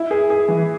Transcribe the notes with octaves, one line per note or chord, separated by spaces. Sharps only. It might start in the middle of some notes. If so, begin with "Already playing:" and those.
Already playing: E4
G#4
G#4
E3